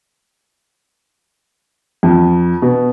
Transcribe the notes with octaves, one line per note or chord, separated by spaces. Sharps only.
F2
B2